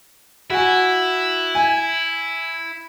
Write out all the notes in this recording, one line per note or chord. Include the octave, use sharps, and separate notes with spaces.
E4 F#4 G#5
G#5